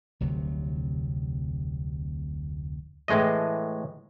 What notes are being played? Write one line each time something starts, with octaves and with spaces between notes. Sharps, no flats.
F1 D2 C3 F#3
A2 E3 G#3 A3 D#5